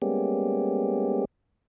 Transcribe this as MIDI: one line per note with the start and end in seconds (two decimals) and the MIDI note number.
0.02 1.25 55
0.02 1.25 56
0.02 1.25 58
0.02 1.25 59
0.02 1.25 61
0.02 1.25 67